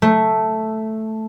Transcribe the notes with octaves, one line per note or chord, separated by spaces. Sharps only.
A3